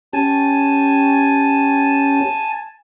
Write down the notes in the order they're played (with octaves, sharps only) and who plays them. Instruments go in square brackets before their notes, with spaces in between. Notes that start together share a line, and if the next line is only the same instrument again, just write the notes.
[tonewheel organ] C#4 G4 [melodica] G#5 A5